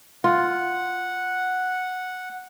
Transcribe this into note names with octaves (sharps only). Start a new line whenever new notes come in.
F4 F#5